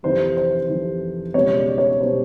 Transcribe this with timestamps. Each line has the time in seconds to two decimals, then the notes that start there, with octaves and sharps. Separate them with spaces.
0.03 F2 C3 E3 C5
0.37 C5
0.69 F2 C3 E3
1.34 C#2 B2 G3 C#5
1.57 D5
1.78 C#5
2.00 B2 G3 C5